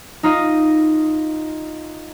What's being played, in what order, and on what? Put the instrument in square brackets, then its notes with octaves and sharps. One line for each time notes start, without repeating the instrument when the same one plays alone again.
[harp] D#4 F4 D#5